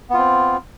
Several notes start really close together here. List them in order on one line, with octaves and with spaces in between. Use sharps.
B3 F4 C4